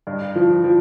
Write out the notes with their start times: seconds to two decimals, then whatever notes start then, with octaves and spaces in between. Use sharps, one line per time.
0.07 G2
0.36 F3
0.64 F3